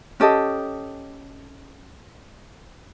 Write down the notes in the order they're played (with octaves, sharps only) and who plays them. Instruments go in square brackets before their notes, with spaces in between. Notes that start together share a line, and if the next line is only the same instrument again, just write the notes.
[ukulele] C#4 G4 A4 D#5